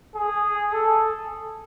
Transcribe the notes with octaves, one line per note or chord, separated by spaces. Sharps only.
G#4
A4